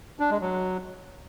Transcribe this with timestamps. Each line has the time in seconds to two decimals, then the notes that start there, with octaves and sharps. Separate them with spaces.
0.20 D4
0.30 G#3
0.41 F#3